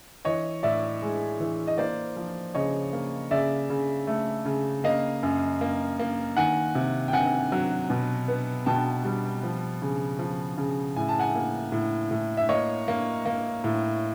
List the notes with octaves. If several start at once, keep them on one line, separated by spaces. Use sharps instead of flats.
E3 C#5 D#5
A2 D5 E5
G#3
E3
D#5
A#3 C5 D5
F3
C#3 C#5 D#5
A#3
C#3 D5 E5
C#3
A3
C#3
A#3 D#5 F5
F#2
A#3
A#3
D#3 F#5 G#5
C3
G5
C3 F#5 G#5
F#3
B2
B3
B2 G5 A5
G3
F3
C#3
F3
C#3
A2 G#5
A5
F#5 G#5
A#3
A2
A2
E5
A#3 C#5 D#5
A#3
A#3
A2